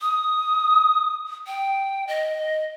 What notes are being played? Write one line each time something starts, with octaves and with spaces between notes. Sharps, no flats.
D#6
G5
D#5